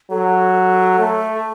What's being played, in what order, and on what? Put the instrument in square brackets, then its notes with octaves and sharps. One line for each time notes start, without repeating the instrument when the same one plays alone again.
[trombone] F#3 [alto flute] A4
[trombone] A3